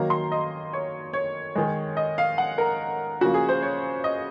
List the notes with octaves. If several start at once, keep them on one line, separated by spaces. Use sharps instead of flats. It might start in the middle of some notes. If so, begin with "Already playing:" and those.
Already playing: D#3 F#3 A#3 A#5
C6
D#5
C#5
C#5
D#3 G#3
D#5
F5
F#5
A#4
C#3 F3 A#3 F#4
G#4
C5
C#5
D#5